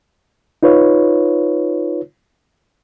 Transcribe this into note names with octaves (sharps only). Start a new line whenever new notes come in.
D#4 F4 B4 C#5